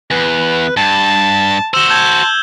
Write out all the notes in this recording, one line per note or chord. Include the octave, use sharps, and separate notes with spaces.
E2 B4
G2 A5
F#4 C5 E6 E7 G7
A5 G6 G#6